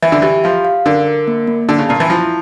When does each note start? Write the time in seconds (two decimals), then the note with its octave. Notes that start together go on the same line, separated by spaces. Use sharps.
0.02 E3 E5
0.12 D3
0.22 E3 G4
0.44 F3 F5
0.65 F5
0.86 D3 A#4
1.07 A#4
1.28 A#3
1.47 A#3
1.69 D3 A5
1.79 C#3
1.89 A#2 A5
2.00 E3
2.10 F3 E4